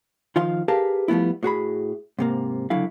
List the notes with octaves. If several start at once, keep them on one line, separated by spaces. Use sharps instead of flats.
D#3 F3 F4 F5 C6
G4 G#4 A#4 B4 F5 A5
F3 G3 A3 B3 E4
A2 F#4 G#4 B5
G#2 C3 A#3
C#2 D3 F#3 E4 F5